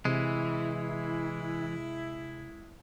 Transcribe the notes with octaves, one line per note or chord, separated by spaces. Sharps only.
C3 E3 G#3 E4